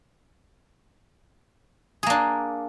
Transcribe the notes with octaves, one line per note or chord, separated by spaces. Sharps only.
A#3 D4 G#4